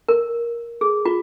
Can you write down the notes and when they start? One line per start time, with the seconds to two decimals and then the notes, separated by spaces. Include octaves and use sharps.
0.08 A#4
0.81 G#4
1.05 F4